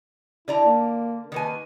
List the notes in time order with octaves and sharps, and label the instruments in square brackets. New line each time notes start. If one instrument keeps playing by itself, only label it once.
[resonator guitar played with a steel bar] D3 D5 A#5 [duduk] E4
[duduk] A#3
[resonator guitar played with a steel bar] D#3 A#3 G#5 [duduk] B4